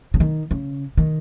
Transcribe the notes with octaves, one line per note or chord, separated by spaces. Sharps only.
C#3
D#3
C#3
D#3